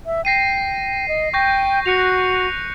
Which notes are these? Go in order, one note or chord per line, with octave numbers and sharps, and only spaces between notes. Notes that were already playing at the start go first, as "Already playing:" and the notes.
E5
G5 A#6 C7 D#7
D#5
G5 C#6 G6 A#6
F#4 F#6 C#7 F7